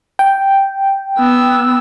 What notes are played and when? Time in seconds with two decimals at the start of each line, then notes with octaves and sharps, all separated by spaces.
0.19 G5
1.19 B3 E6